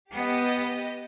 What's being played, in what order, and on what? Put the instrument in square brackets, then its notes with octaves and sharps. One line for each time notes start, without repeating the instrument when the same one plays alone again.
[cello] B3 [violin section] G4 B4 D#5